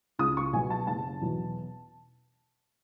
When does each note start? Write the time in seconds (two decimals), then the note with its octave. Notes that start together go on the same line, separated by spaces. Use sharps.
0.19 C#2 D#6
0.37 C#6
0.53 B2 F#3 G#5
0.70 A5
0.87 F#1 A5
1.22 E2 B2 F#3